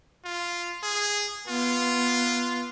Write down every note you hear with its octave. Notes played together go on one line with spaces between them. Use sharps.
F4
G#4
B3 F4